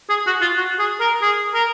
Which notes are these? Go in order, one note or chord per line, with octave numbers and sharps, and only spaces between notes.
G#4
F#4
F4
F#4
G#4
A#4
G#4
A#4